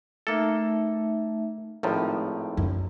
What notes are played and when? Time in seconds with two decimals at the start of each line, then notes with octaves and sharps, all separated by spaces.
0.27 A3 A#3 D#4 A4 E5
1.83 G#1 A2 F3 A#5
2.57 F#2